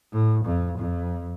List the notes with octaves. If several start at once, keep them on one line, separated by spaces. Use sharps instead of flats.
A2
F2
F2